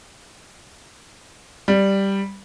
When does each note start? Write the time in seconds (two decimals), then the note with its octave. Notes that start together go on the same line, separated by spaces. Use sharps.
1.68 G3